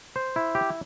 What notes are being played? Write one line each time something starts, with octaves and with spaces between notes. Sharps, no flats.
C5
E4
G4